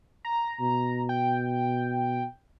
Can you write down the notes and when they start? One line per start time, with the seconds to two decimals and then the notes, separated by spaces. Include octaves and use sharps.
0.25 A#5
0.60 B2
1.09 G5